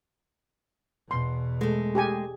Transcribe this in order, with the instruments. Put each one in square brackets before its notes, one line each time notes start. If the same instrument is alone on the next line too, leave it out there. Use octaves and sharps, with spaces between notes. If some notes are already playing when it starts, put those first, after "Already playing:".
[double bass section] E2 B2 [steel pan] C6
[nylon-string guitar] G#3 A3
[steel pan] G4 G#4 G#5